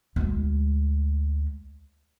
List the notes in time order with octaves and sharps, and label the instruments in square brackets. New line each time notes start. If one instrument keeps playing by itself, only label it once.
[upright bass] D2 G#3